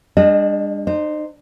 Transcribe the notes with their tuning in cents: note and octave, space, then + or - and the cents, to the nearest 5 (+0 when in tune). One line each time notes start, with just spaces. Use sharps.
G3 +45 D4 +0 D#5 -20
D#4 -35 C5 +0